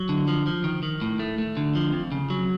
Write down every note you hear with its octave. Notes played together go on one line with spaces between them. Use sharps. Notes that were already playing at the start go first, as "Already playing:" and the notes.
Already playing: F#3
D3
F3
F3
D#3
D#3
A2
A3
A3
D3
F3
F2
C#3
F#3